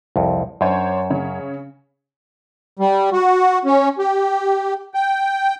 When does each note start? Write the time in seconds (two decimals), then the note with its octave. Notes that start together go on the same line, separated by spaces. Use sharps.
0.16 C2 F2
0.61 F#2 D4 C5 C#5
1.10 C#3 C#5
2.79 G3
3.13 F#4
3.65 C#4
3.98 G4
4.94 G5